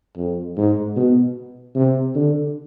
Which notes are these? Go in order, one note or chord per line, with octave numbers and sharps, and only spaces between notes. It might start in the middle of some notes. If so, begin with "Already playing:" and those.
F2
G#2
B2
C3
D3